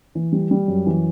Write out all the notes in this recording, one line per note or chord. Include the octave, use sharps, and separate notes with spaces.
E3
G3
G3
F#2
E3